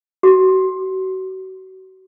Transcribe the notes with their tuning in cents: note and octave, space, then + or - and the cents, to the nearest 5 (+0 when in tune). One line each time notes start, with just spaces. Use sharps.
F#4 +35